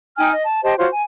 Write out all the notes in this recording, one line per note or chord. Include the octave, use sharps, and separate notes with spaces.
D#4 G5 G#5 F6
D#5
A5
G4 C5 D#5 A5
F4 F#4 C5 C#5
G#5